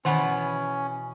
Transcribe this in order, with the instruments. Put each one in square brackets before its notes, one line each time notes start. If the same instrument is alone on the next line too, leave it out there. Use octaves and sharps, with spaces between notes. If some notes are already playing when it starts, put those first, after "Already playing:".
[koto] B2 E3 B3 [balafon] D#3 F#5 B5 [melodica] C#4